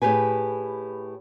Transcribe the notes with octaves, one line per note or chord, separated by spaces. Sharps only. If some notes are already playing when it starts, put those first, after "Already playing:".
A2 G4 G#4 B4 G#5